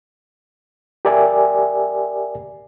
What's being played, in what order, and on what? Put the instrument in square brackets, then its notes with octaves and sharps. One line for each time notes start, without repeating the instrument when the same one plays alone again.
[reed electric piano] G4 A#4 D5 E5 G#5